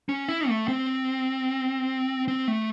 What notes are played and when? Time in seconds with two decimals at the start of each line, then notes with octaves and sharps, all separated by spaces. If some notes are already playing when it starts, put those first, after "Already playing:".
0.09 C#4
0.28 E4
0.49 A3
0.68 C4
2.28 C4
2.48 A3